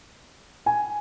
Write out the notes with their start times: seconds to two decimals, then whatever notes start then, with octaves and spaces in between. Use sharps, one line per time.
0.66 G#5